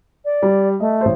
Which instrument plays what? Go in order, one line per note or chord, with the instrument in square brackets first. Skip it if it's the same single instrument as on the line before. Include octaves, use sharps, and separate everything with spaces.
[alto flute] D5
[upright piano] G3
[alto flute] A3 [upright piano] D#5
[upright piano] A1 C5